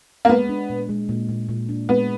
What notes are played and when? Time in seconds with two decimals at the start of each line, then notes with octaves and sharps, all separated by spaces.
0.25 A#3
0.29 G#3 B3
0.49 D4
0.70 A#2
0.89 G#3
1.09 A#2
1.29 A#2
1.49 A#2
1.69 D4
1.89 G#3 B3